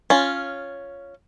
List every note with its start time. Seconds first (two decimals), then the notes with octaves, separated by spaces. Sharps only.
0.10 C#4 F4